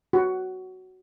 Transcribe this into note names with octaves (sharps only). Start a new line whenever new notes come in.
F#4